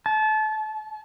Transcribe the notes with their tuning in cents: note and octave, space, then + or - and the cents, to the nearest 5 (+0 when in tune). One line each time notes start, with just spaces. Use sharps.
A5 -30